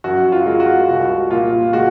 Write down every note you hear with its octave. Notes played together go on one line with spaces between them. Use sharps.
F#2 F#4
F4
G#3
F#4
C2 F#4
A#2 F4
G#3 F#4